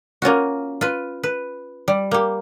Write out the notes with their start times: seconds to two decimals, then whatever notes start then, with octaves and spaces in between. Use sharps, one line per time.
0.22 A#3 C#4 F4 F#4
0.81 F4 B4
1.23 B4
1.88 G3
2.11 A#3 G4